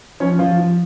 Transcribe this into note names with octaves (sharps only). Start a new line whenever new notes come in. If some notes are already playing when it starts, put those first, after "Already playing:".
F3 C#4 C#5
F3 F4
F3